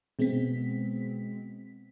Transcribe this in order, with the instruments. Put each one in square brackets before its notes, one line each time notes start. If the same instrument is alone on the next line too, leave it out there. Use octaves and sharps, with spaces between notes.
[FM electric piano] B2 G#3 B3 C4 B6